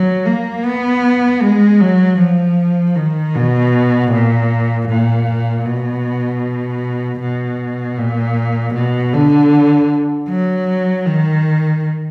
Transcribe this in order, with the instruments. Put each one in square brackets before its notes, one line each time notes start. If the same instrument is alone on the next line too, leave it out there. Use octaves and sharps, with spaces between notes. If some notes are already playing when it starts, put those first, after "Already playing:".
Already playing: [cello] F#3
A#3
B3
G#3
F#3
F3
D#3
B2
A#2
A#2
B2
B2
A#2
B2
D3
F#3
D#3